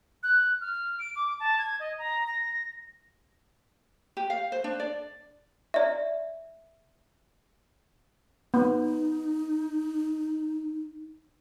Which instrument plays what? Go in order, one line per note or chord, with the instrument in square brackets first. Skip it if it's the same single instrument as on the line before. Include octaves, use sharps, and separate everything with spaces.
[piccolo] F#6
F6
D7
D6
A5
G#6
D#5
A#5
A#6
[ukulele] G4
F5
C5
D4
D5
[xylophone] D5 E5
[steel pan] B3 [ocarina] D#4